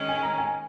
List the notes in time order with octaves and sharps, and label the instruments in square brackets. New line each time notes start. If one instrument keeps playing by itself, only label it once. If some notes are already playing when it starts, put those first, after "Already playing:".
Already playing: [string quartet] D#3 G#3 C#4
[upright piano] G#5
A#5
G#5